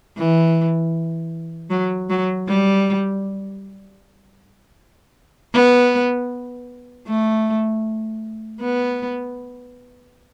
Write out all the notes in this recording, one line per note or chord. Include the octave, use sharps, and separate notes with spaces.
E3
F#3
F#3
G3
B3
A3
B3